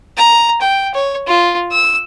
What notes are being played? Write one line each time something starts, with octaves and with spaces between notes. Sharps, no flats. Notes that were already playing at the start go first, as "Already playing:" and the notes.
A#5
G5
C#5
F4
E6